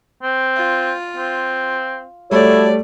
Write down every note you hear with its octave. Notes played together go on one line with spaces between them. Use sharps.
C4
F4
C4
G3 A3 E4 F#4 A4 C#5 D5